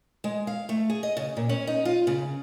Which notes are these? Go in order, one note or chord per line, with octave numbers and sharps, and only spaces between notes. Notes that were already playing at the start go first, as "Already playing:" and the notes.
G#3
F5
A3
G#4
D#5
C#3
A#2
C#4
D#4
F4
C#3